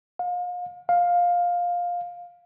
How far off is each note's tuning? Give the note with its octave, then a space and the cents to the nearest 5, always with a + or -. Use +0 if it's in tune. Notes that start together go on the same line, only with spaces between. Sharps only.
F5 +35
F5 +10